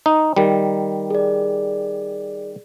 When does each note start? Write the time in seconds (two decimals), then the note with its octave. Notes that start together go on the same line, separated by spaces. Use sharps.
0.06 D#4
0.36 D#3 G3
1.10 G#4 D5